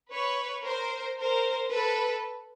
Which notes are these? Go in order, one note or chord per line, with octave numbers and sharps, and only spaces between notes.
B4 C#5
A#4 C5
A#4 C5
A4 B4